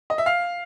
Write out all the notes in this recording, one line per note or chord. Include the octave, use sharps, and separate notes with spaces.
D#5
E5
F5